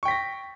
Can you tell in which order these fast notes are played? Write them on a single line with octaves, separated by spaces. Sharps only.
C#6 G5 B6 A#6